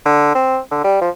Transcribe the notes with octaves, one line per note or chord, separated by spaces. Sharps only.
D3
C4
D3
G3
F3